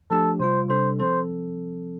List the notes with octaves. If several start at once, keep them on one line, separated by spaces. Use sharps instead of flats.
F3 A3 D4 G4 A4
C3 G3 F4 C5
C3 G3 D4 A4 C5
F3 C4 A4 C5